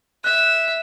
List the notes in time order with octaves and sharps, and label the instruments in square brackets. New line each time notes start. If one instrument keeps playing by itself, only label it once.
[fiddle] E5 [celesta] F#6